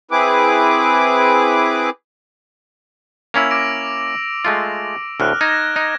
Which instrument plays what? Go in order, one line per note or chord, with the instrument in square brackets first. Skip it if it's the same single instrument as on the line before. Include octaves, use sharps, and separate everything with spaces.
[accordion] C4 E4 G#4 B4 D6
[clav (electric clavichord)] A#3 C#4 E4 [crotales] E6 F7
[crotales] D6 A#6 D7
[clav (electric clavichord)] G#3 A3 F4
[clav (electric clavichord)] D2 A2 [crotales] F6 F#6
[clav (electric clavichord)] D#4 [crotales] G#6 A#6 E7
[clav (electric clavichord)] D#4